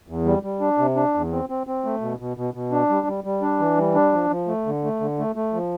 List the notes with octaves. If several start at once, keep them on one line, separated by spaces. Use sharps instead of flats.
E2
G3
G3
D4
C3
D4
E2
C4
C4
C4
A3
B2
B2
B2
B2
D4
G3
G3
G3
D4
E3
G3
D4
F3
F3
A3
D3
A3
D3
A3
A3
F3